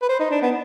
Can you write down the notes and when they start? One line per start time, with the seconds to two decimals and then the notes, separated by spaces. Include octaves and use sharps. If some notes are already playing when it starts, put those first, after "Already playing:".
0.02 B4
0.09 C5
0.20 D#4
0.31 D4
0.42 B3